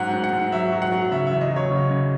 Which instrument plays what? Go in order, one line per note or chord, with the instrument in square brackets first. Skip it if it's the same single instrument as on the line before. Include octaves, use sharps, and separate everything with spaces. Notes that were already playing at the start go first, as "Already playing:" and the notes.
Already playing: [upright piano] G#2 F#3 F#5
G#2
F#5
G#2
F#3 E5
F#3
F#5
F#3
C#3 E5
E2 E5
D#5
F#3
C#5
C#3
C#3